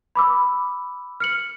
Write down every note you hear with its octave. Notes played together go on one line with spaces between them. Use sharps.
B5 D6 E6
F6 C#7 F#7